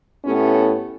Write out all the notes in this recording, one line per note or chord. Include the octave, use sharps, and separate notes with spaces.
A2 A3 B3 C#4 E4 G4